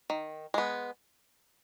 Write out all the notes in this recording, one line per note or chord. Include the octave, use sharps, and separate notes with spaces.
D#3
G#3 B3